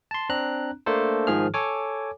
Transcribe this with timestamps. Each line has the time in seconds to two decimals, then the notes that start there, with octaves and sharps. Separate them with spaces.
0.11 A5 C6
0.29 C4 D4 A#5 F#6
0.86 A3 A#3 D4 A4 C5
1.27 G#2 D#3 F3 G#4 F6
1.54 A4 C#5 G#5 D6